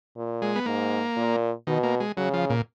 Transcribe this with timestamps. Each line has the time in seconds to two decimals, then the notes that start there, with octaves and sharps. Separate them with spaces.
0.17 A#2
0.42 G#3
0.56 B3
0.66 G#2 A#3
1.17 A#2
1.67 B2 D#3
1.83 A#3
2.00 G#3
2.17 C#3 F#3
2.34 F3
2.50 A#2